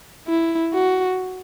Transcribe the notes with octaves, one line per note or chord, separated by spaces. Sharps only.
E4
F#4